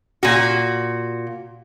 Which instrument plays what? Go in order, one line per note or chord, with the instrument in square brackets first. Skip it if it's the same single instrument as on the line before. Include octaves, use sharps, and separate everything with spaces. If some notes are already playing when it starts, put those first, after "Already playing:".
[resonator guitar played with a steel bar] A#2 F#4